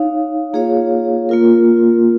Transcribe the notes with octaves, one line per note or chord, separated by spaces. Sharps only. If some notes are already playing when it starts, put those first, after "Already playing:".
Already playing: D#4 C#5 F5
A#3 F4 G#4 C#5 F5
A#3 F4 A#4